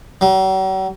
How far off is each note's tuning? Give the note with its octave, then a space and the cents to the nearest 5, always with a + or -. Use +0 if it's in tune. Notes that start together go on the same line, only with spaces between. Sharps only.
F#3 +45